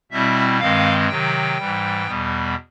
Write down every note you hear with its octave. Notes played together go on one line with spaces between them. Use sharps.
B2 G3 C4 E4 E5
G2 D#3 G#3 C4 F5
C3 D#3 F#3 G5
G#2 E3 G3
E2 B2 G3 B3